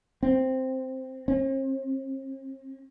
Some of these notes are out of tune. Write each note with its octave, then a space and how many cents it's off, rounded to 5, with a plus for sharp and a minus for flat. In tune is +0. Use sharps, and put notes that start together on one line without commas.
C4 +0
C4 +45